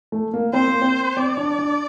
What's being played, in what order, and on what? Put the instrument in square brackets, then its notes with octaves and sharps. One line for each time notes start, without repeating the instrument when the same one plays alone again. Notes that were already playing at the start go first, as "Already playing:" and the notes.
[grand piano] A3
A#3
[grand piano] C4 [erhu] C5
[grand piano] A#3
C4
[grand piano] C4 [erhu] D5
[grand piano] D4
D4